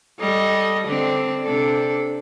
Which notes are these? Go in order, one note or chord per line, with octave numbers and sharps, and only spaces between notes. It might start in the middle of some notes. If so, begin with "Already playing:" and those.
G3 A4 D#5
D3 C4 D4
C3 D4 A4